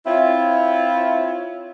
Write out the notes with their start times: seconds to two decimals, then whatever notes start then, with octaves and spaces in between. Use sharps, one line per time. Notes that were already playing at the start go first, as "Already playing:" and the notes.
0.05 C4 E4 F4 C#5 E5